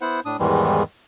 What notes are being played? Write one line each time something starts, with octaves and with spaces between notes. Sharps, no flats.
B3 E4 C5 F#5
A2 D4 D#6
E2 G#2 D#3 E3 G3 G#3